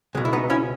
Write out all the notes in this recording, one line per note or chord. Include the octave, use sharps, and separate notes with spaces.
C#2 B2 G#3
E4
B3 D#4
C#4 E4